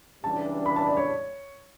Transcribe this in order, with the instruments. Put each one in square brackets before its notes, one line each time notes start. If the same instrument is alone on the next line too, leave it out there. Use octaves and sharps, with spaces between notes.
[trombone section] C#2 C#3 E3 G3 D4 [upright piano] A5
[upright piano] B5
A5
D5
C#5